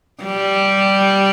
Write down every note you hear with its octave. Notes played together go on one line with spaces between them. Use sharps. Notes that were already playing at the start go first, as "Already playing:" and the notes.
G3